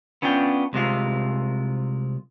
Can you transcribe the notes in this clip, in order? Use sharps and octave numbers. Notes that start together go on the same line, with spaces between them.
B3 C#4 D4 F4 G5
C2 C3 G#3 F4